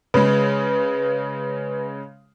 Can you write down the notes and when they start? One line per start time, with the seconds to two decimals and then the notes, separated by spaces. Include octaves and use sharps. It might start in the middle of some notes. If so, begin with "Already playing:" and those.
0.14 C#3 G#3 B4